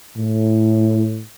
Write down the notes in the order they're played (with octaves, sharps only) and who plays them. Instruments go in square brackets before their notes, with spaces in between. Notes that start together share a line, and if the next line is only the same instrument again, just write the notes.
[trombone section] A2